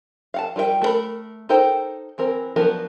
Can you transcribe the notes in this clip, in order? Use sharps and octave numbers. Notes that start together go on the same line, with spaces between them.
F5 F#5 A5
G3 F4 A#4 D#5 G5
A3 A4 A#4 B5
D#4 A4 A#4 C5 G5
E3 C4 A#4
F3 F#3 B3 D4 A#4